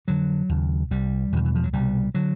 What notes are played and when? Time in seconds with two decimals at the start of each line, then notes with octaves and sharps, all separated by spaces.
0.08 F2 D3 F#3
0.49 D#2 C#3
0.91 C2 C3 G3
1.32 E2 B2 D#3
1.45 E3
1.55 F3
1.64 F#3
1.73 C2 B2 G3
2.15 D3 F#3